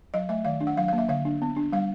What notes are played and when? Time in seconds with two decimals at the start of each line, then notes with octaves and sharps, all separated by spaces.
0.14 F#3 D#5
0.29 A3 E5
0.45 D#3 F5
0.61 D4
0.67 F#5
0.77 F#3 F5
0.88 F5
0.93 A#3
0.98 E5
1.09 D3 F5
1.25 D4
1.42 B3
1.57 D4
1.73 G3 F5